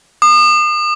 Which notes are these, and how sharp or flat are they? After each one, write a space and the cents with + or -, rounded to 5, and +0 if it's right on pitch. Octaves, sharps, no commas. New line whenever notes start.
D#6 -40